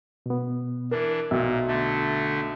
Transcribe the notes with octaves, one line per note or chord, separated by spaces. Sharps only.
B2 B3
E3 D4 A#4
B1 A#2 E5
D3 A3